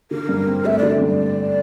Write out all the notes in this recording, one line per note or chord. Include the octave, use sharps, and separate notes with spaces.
D3 A#4
G2
C4
A3 E5
D3 D5
G2 D5